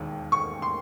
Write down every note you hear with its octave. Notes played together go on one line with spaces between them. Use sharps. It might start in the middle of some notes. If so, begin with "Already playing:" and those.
Already playing: E1 D#2 D#3
C#6
C6